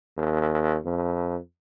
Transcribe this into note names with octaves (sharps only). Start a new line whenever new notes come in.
D#2
F2